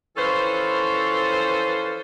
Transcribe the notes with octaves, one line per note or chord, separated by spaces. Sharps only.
E3 F3 C#4 A4 B4 C5